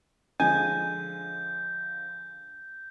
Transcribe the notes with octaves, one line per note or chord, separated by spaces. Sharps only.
D3 F3 G#3 D#5 G#5 G6